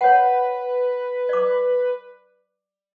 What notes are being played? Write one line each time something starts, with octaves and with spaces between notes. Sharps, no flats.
B4 C#5 F#5
D5 D6